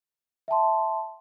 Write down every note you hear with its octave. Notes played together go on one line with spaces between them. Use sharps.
E5 G5 A5 C6